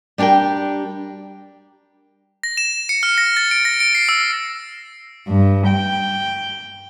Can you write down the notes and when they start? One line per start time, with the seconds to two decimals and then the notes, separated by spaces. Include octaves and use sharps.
0.18 G3 D4 G4 A#4 G5
2.43 A#6
2.57 E7
2.89 C#7
3.03 F6
3.18 A#6
3.37 A6
3.51 D7
3.65 A#6
3.80 D7
3.95 C7
4.09 E6
5.28 G2
5.67 G5